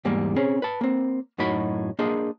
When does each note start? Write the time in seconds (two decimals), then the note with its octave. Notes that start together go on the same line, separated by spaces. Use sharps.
0.05 E2 G#2 G3 A#3
0.36 C4 C#4 G#4
0.62 B4 A5
0.81 A#3 C4
1.38 F#2 A2 D#4 F#4 B5
1.99 A#3 D4 G#4 C5 D#5